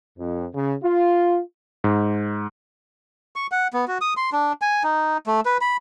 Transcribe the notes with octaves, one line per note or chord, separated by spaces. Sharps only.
F2
C#3
F4
G#2
C#6
F#5
B3
F#4
D#6
C6
D4
G#5
D#4
A3
B4
B5